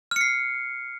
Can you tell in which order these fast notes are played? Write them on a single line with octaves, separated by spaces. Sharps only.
F6 C#7 C7